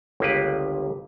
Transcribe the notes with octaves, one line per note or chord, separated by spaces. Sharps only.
G1 C#2 A#3 G4 B4